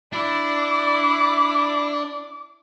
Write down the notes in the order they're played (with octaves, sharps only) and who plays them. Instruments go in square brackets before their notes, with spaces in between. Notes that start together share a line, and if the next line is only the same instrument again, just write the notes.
[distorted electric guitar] D4 [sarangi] E4 [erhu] D6